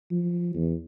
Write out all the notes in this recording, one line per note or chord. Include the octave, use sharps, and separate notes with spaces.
F3
E2